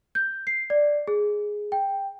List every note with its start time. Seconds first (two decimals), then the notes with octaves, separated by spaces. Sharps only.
0.15 G6
0.47 C7
0.70 D5
1.08 G#4
1.72 G5